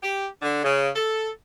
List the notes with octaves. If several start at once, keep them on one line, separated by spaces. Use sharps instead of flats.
G4
D3
C#3
A4